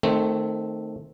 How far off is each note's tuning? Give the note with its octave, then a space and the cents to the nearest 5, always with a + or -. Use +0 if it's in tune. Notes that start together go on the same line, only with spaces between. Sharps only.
D#3 -15 A3 +5 C4 +5